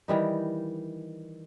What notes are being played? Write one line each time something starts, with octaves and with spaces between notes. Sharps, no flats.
D#3 E3 G3 D#4